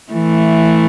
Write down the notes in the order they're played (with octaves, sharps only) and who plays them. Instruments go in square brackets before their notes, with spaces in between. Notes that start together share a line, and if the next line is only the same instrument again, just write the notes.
[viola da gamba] E3 A3